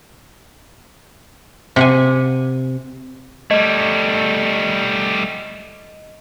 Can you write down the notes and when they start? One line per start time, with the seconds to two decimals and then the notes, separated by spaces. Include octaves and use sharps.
1.76 C3 F#5 G#5
3.51 G3 A3 D#5